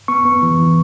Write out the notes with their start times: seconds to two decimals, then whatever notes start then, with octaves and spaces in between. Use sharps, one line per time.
0.08 B3 C#6
0.25 B3
0.42 E3
0.59 E3